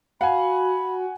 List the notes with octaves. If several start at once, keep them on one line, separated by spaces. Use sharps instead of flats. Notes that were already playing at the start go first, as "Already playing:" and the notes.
F#4 F5 F#5 G#5 B5